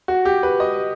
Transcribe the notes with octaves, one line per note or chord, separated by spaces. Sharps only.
F#4
G4
B4
D#5